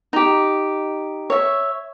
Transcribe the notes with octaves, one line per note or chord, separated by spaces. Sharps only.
D#4 G4
C#5 E5